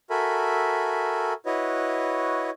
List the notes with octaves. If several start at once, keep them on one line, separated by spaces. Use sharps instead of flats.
F#4 A4 A#4 E5 G#5 B5
E4 F#4 B4 C#5 D#5